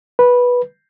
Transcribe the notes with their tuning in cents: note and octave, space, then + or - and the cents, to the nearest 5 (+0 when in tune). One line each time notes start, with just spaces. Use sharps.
B4 -10